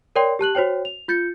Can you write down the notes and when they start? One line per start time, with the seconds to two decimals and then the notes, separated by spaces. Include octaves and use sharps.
0.16 A#4 C#5 D5 G5 C6
0.39 G4 A5 F#6 F#7
0.55 F#4 C5 C#5 G5
0.85 F7
1.08 F4 G6 A6 C#7